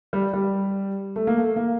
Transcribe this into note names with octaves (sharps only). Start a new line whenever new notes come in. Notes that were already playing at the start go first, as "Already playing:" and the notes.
G3
G3
A3
A#3
A3
A#3